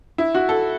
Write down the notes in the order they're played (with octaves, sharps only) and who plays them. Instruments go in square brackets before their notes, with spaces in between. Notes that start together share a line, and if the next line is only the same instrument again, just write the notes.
[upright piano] E4
F#4
A4